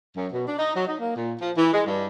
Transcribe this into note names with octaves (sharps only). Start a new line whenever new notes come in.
F#2
B2
D4
D#4
F#3
D#4
A#3
A#2
F3
E3
G#3
G2